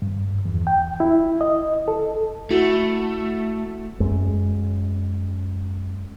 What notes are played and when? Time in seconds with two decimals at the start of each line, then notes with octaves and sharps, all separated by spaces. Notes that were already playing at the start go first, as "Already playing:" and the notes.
0.02 G2
0.45 E2
0.67 G5
1.00 E4
1.41 D#5
1.88 A4
2.51 A3 E4 F#4
4.00 F#2 G#3